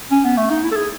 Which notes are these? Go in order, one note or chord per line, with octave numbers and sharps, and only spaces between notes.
C#4
B3
A3
D#4
E4
A4
G#4